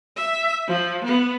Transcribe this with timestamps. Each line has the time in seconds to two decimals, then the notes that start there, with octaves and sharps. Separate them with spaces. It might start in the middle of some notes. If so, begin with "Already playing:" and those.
0.16 E5
0.68 F3
1.05 B3